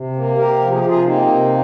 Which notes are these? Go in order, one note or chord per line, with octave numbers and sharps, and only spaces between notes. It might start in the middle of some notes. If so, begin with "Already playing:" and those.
Already playing: C3
A#3
C3 G4 A#4
F3
G#4
G4
C3 F4 G#4
A#3 C4 D#4
C3